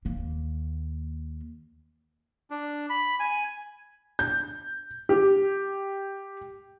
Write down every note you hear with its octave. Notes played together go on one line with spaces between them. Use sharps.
D#2 A#3
D4
B5
G#5
G6
G4